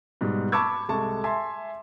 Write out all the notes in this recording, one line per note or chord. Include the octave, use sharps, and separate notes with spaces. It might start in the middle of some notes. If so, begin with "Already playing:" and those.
G#2 B2 G3
A5 B5 C#6 D6 E6 G#6
C2 G#3 A4 A5 C#6
E5 G#5 A5 C6